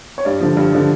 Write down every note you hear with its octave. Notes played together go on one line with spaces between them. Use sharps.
C#5
G2 D5
D3 F3
G2
D3 F3